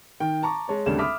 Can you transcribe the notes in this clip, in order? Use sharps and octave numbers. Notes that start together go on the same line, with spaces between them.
D#3 G5
A5 A#5 C#6 D6
G#3 C#5 A5
G#1 D2 C#3 G3 D4 E7
E5 B5 D6 D#6 F6 B6